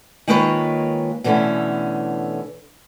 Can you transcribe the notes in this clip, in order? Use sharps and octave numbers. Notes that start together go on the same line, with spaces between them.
D#3 G#3 A#3 F4 B4 C#5
B2 D3 E3 A3 C#4